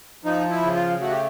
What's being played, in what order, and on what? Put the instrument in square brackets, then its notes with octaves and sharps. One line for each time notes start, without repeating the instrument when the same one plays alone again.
[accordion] F3 D#4
E4
C#3
F4
A3 F#4
G4